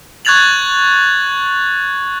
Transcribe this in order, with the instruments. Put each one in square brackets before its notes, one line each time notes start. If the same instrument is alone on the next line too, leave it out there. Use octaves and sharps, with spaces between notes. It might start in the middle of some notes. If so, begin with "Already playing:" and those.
[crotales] C#6 F#6 G#6 A6 F7 F#7